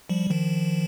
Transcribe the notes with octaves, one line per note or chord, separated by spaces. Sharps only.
F3 G3
D#3 F3